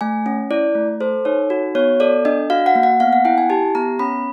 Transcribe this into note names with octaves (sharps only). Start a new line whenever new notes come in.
A3 G#5
C#4
E4 D5
A3
A4 C5
D#4 C#5
F#4
B3 C#5
A4 D5
D4 D#5
F#4 F5
F#5
A#3
F#5
B3 F5
F#5
E4 G5
G#5
G4 A5
B3 A#5
C#4 B5